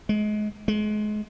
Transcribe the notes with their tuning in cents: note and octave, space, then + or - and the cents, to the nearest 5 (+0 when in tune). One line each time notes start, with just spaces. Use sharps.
G#3 +30
G#3 +30